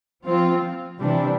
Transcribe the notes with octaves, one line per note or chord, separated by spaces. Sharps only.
F3 C4 F4
C3 E3 G3 D4